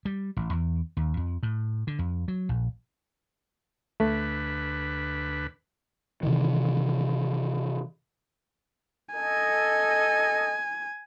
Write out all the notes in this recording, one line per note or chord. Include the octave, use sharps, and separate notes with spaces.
G3
A1
E2
D#2
F2
A2
D3
F2
F#3
A#1
D2 A3 B4
C3 D#3 E3
A4 D#5 G#5